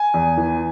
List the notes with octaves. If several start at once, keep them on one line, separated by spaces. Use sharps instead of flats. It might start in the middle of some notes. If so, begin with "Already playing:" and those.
Already playing: G#5
E2
E3